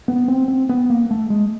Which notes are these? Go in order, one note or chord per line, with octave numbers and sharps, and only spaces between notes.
B3
C4
C4
B3
A#3
A3
G#3